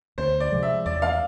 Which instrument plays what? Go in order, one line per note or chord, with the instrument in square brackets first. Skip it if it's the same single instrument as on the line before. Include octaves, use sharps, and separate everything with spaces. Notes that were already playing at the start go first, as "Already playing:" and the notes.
[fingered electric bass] D2 [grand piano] C5
[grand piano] D5
[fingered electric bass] C3 F3 G#3
[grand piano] E5
[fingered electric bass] E2 [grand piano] D5
[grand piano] F5